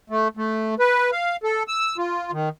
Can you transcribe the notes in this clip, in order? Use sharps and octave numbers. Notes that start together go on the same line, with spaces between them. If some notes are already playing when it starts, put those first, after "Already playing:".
A3
A3
B4
F5
A4
E6
F4
D#3